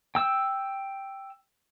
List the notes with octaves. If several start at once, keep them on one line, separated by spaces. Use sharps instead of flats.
G5 E6